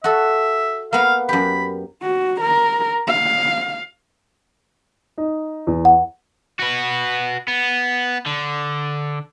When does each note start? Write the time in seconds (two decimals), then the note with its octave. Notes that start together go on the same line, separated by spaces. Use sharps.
0.04 F#4 A4 E5
0.93 A#3 B3 F5
1.29 F#2 G4 B5
2.02 F#4
2.41 A#4
3.07 F5
5.18 D#4
5.67 E2
5.85 F#5
6.60 F#4 B4
7.48 B3
8.26 D3